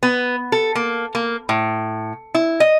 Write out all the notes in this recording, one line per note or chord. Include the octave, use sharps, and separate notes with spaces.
B3
A4
A#3
A#3
A2
E4
D#5